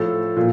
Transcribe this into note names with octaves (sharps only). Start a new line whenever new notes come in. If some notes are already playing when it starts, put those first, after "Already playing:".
Already playing: A2 F3 A4
A#2 F3